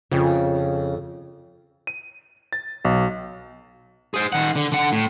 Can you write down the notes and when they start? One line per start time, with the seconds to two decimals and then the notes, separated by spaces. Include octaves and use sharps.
0.11 F2 C#3
1.87 D#7
2.53 A6
2.85 B1
4.14 G#4 C5
4.33 D#3 F#5
4.56 D3
4.72 D3 F#5
4.92 A2